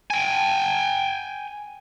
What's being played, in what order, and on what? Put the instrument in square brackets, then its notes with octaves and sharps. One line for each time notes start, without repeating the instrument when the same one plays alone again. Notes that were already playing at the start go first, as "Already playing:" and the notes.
[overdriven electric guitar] G5 G#5